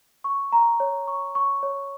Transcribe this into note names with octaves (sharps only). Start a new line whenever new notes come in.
C#6
A#5
C#5
C#6
C#6
C#5